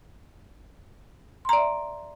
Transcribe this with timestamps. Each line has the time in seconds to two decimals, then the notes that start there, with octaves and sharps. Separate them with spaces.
1.45 C6
1.49 A#5
1.53 D5
1.57 E5